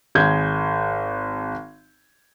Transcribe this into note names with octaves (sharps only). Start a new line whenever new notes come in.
G#1 G#4 G6 G#6